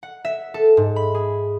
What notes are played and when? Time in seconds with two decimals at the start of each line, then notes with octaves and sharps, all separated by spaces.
0.03 F#5
0.25 E5
0.54 A4
0.77 G#2
0.96 B5
1.14 G#4